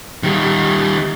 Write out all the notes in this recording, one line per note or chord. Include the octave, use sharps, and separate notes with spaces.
D#3 G3